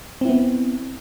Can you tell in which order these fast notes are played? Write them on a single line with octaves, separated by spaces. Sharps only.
C4 E4 B3